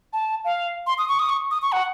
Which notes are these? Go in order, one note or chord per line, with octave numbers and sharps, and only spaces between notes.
A5
F5
C6
D#6
C#6
D#6
C#6
D#6
C#6
F#5